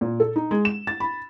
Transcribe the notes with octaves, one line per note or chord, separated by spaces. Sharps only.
A#2
A4
D#4
G#3
E7
A6
B5